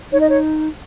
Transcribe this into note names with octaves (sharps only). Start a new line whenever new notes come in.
D#4 C#5
D#5
C#5